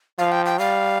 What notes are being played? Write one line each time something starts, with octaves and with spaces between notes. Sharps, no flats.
F3 F5
G5
G5
G3 F5